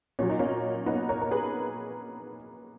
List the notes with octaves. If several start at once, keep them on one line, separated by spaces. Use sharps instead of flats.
A#2 F#3 C#4
D#4
A#3 C#4
B3 D#4
A#4 C#5
A#4
G#4 B4